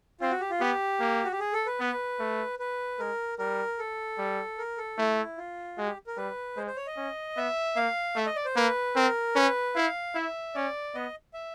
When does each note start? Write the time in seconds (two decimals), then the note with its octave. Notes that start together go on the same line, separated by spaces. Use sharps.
0.21 C4 F4
0.31 F#4
0.40 G4
0.51 F4
0.60 B3 G4
1.00 A#3
1.24 F#4
1.32 G4
1.40 G#4
1.53 A4
1.66 B4
1.80 B3
2.19 A3
2.59 B4
2.99 G#3 A#4
3.38 G3 A#4
3.79 A4
4.18 G3
4.58 A#4
4.78 A4
4.98 A3 E4
5.38 F4
5.77 G#3 F#4
5.87 G4
6.07 A#4
6.17 G3 B4
6.56 G#3 C5
6.67 C5
6.76 C#5
6.87 D#5
6.97 C#4
7.36 B3 E5
7.76 A#3 F5
8.16 A3 E5
8.26 D#5
8.36 D5
8.45 C5
8.55 A#3 B4
8.96 C4 A#4
9.35 C#4 B4
9.75 E4 F5
10.14 E4 E5
10.54 C#4 D5
10.94 B3 D#5
11.34 E5